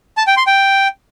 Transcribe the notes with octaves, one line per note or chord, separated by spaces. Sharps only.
A5
G5
C6
G5